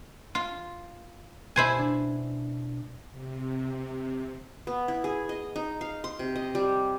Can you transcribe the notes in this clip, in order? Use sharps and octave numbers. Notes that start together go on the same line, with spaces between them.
F4
B2 E4 C5 G#5
D4
C3
B3
E4
G#4
D#5
D#4
F5
C6
C3
D#5
G3